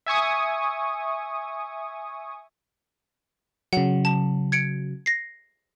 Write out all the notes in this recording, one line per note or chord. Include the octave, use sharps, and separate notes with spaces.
E5 G#5 C#6 D#6
C#3 F#3 F#5
A5
G#6 C#7 D7
A#6 C7